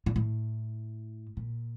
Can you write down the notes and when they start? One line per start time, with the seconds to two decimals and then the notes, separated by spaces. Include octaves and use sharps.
0.06 A#2
0.16 A2
1.37 A#2